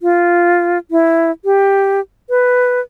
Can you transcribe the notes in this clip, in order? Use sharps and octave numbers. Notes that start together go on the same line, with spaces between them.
F4
E4
G4
B4